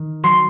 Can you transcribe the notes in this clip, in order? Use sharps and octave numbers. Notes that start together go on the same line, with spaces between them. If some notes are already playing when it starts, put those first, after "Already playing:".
Already playing: D#3
F#3 C6